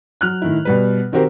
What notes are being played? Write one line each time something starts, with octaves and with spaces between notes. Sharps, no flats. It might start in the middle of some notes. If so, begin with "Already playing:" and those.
F#3 F6 F#6
A2 D#3 E4
B2 G3 B4
D#3 C4 F#4 G4 A#4 C5